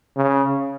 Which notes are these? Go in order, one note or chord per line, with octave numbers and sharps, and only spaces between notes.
C#3